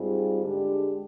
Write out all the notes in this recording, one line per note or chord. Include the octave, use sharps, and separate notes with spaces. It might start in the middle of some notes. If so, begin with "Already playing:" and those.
Already playing: G#2 G3 C4 F4 G#4
D3 G#3 D4 G4